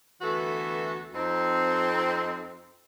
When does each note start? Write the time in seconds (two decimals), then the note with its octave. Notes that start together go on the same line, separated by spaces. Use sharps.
0.21 D2 E3 B3 F#4 A4 E5
1.13 F2 C4 D#4